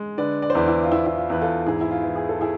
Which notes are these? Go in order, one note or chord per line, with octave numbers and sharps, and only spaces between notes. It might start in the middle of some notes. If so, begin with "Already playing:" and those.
Already playing: G#3
D3 B4 D5
D5
C5
E2 B4 D5
E4
F4
E2 E4
E4
F4
E2 B4
F4 A4
G#2 E4 G#4
E4
F4
E3
G#4
A4
E4 G#4